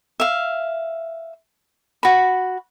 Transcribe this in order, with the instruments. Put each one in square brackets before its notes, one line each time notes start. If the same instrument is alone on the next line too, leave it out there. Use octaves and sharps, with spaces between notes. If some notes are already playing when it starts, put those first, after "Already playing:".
[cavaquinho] E5 F5
F#4 B5